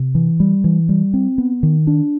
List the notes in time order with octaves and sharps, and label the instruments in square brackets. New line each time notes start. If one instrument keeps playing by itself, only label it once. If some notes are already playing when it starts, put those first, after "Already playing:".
Already playing: [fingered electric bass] C3
E3
G3
E3
G3
C4
B3
D#3
D4